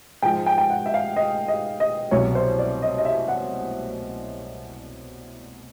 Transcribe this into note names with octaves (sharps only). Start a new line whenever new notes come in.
G#2 F3 G5
G5
G5
F#5
E5
F5
D#5
D#5
D#5
C2 B2 F#3 C#5
C5
D5
D#5
D#5
E5
F#5